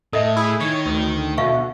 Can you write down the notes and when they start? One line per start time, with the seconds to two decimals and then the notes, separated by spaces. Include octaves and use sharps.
0.13 A2 A4 D#5 E5
0.36 E4 G#4
0.60 D#3 C#5
0.85 D2
1.38 B2 D3 E5 F5 C#6